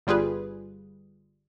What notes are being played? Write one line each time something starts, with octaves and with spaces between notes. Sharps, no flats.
G1 G3 F4 G#4 B4